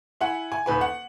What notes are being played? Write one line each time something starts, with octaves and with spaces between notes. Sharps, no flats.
E4 F#5 G#5
G#5
D#1 B4 G#5
F#5